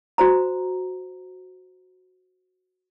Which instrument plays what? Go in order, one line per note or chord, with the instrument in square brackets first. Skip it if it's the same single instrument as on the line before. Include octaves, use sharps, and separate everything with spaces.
[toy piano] F#4 C5 A#5